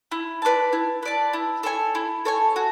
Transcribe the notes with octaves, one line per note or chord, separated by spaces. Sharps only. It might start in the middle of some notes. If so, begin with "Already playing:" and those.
E4
B4 D5 A5
E4
B4 D5 A5
E4
A4 C#5 G#5
E4
A4 C#5 G#5
F#4